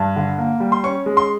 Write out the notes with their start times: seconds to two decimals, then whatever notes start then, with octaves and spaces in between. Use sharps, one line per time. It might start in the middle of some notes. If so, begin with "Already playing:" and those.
Already playing: G2
0.16 D3
0.38 A#3
0.60 G3
0.72 C6
0.84 C#4 C#6
1.06 G#3
1.17 C6